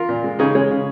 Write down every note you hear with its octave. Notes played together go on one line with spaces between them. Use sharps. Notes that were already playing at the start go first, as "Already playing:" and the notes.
Already playing: F4 A#4
A#2
G#3
C#3 D#4 G#4
G#3 G#4 C#5
C#3